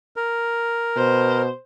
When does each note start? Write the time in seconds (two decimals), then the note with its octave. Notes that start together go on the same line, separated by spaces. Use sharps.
0.16 A#4
0.96 B2 C5